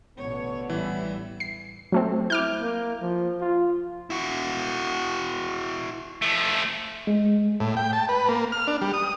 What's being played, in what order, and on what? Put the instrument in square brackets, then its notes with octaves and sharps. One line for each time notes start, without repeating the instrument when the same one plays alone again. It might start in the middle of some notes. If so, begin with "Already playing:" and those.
[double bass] A1 B2 [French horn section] D3 B3 [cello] C#5
[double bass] A1 [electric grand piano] E3 [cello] G3 E4
[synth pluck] C7
F#3 A3 C4
[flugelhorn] E4 [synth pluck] D6 F6 G6
[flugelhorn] A#3
F3
F4
[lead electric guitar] E4 F#4
[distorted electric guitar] F3 A3
[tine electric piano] G#3
[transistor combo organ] A2
G5
A5
B4
A#3
F6
D4
G3
D#6